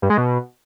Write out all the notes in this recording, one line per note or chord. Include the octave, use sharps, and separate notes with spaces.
G2
G#3
B2